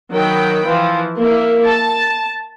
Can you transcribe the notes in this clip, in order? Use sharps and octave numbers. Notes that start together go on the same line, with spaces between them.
D#3 F#3 G5 B5
E3 F3
A#3 E4
A5